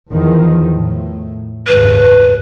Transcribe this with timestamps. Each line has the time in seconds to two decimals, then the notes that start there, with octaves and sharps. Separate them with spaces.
0.11 E2 D#3 F3
0.76 A2
1.68 F#1 D#2 G#2 B4